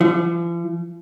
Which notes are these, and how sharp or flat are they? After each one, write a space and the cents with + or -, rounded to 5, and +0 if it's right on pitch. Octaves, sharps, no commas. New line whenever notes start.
F3 -45